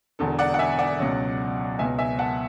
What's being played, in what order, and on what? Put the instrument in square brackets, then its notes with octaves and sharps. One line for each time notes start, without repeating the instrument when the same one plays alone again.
[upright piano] E1 E2 D3 A4
D5 F#5
F#5
E5 G#5
D5 F#5
C#2 B2 F#3 C#4
C#2 B2 F#3 B3 E5 G#5
E5 G#5
F#5 A5